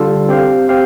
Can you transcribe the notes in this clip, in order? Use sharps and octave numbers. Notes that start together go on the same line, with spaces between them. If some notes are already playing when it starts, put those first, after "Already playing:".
Already playing: D3 G3 F4 A4
C4 G4 C5 F5
C4 G4 C5 F5